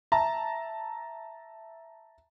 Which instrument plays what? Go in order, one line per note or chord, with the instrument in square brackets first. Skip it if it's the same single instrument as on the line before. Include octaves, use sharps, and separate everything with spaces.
[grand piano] E5 A5 A#5